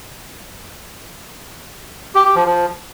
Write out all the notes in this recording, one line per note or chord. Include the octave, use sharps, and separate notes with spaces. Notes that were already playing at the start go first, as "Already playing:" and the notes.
G4
G4
F3
F3